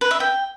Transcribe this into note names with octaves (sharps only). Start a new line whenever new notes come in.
B4
E5
G5